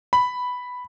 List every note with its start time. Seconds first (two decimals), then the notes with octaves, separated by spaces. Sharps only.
0.13 B5